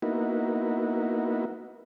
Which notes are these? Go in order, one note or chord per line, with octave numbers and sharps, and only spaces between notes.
A#3 B3 D#4 E4 F#4